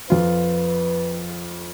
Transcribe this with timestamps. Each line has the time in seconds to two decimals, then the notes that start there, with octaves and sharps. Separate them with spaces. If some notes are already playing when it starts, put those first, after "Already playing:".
0.10 F2 F4 B4